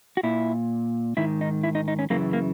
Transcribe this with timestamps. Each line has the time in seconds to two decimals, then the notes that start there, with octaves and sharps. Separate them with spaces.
0.17 F#4
0.23 A#2 E4
1.17 G#2 D#3 E4
1.41 D#4
1.64 E4
1.75 D#4
1.88 D#4
1.99 C#4
2.10 F#2 C#3 E3 A#3
2.33 A#3